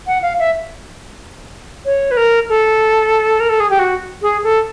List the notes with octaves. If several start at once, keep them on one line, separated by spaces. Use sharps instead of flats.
F#5
F5
E5
C#5
B4
A#4
A4
A#4
A4
G#4
G4
F#4
G#4
A4